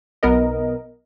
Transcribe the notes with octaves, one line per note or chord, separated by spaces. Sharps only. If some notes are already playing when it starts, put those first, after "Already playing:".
B1 B3 A#4 D#5